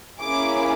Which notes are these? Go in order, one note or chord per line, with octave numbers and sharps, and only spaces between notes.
A#3 C#4 E4 G#4 D6